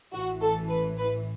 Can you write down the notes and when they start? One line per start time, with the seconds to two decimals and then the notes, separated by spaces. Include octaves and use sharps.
0.13 A1 A2 E3 F#4
0.42 A4
0.69 B4
0.98 B4